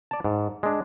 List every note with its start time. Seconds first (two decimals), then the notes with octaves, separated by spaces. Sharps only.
0.11 D5 A5
0.24 G#2
0.63 G#3 D4